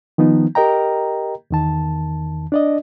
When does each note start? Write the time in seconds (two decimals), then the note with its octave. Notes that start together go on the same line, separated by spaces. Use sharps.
0.18 D#3 F3 B3 D#4
0.55 G4 A#4 D#5 G5 A#5
1.51 E2 D#3 A5
2.52 D4 D5 D#5